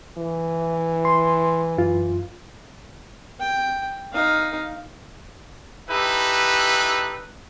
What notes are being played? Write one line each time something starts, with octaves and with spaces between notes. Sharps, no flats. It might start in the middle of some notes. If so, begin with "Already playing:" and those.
E3
C6
F#2 F4
G5
D#4 F5
D#4 E4 G4 A4 B4